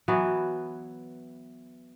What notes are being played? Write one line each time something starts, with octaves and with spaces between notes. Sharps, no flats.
E3 F#3 B3